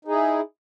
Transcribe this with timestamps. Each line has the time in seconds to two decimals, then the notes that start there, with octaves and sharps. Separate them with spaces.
0.05 D#4
0.08 G#4
0.11 E4